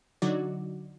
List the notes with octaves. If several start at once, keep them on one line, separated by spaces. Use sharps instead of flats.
D3 F#3 D#4 F#4 D5